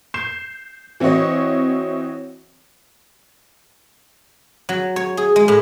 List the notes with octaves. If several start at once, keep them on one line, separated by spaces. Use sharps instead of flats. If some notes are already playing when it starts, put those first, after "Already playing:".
G6 C7 E7
E3 C4 E4 F#4 C#5 D#5
F#3
C#5
G#4
G#3
A2